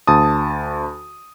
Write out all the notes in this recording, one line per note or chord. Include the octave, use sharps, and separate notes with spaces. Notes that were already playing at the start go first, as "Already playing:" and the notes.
D2 A5 D#6